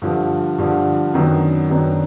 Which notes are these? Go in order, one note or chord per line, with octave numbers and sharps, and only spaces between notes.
G2 D3 F3
G2 D3 F3
F#2 D#3 F#3 B3 D4
F#2 D#3 F#3 B3 D4